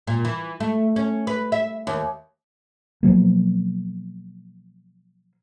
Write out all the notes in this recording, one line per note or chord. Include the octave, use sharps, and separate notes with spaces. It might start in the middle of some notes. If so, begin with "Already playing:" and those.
A#2
E3
A3
C#4
B4
E5
D#2
B2 F3 F#3 A#3